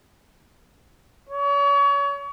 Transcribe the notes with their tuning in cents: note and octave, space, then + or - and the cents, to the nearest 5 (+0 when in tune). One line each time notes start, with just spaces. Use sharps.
C#5 +35